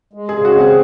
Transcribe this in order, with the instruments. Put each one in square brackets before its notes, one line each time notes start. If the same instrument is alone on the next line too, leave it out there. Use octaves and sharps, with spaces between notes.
[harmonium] G#3
[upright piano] G#4
[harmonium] C#3
[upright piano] F#4
[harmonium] C4
[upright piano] G#4